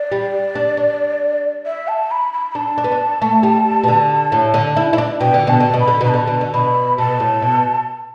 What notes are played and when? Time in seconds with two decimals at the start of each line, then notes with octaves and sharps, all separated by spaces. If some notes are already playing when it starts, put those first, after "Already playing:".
Already playing: D5
0.12 G3
0.55 D4
0.77 D4
1.66 E5
1.88 A5
2.11 B5
2.33 B5
2.51 B5
2.55 D4 A5
2.78 D4
2.84 B3
2.92 D4
3.22 A3
3.43 G3
3.84 B2
3.88 D3
4.32 A2
4.54 D3
4.76 E4
4.93 E4
4.98 D4
5.21 B2 G5
5.34 D3
5.47 B2 A5
5.60 D3
5.74 B2
5.80 B5
5.88 D3
6.01 B2 B5
6.09 D3 A5
6.27 B2
6.41 D3
6.53 B2 B5
6.98 B2 A5
7.20 A2
7.42 B2